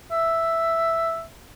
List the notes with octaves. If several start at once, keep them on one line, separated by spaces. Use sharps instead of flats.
E5